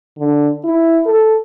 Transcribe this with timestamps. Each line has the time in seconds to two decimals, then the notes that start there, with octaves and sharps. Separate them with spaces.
0.19 D3
0.64 E4
1.06 A4